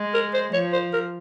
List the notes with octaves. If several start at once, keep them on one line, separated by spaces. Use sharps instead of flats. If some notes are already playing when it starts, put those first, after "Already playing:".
Already playing: G#3
A#4
C5
F3 C#5
C5
A#4